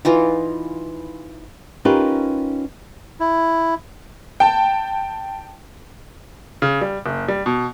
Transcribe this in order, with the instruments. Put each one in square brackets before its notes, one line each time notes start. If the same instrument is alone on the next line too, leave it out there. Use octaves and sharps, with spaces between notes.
[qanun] E3 D#4 F4
[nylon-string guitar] C#4 D#4 F4 G4 A#4 B4
[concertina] E4
[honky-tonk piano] G5 A5
[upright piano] C#3
G3
F#1
G3
B2